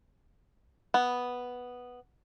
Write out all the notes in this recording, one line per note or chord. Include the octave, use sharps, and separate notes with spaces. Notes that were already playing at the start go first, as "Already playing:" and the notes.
B3